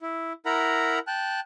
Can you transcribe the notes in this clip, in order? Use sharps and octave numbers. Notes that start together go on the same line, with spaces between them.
E4
E4 A#4 F#5 A#5 B5
G5 A5 F#6